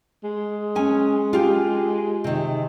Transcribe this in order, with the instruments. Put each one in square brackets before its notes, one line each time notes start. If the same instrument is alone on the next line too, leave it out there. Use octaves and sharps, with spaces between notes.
[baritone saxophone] G#3
[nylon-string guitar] C#4 G#5
F4 G4
C3 D#3